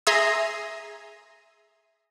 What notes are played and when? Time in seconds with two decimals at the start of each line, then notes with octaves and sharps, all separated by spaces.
0.07 G#4 E5 A#5 C6 D#6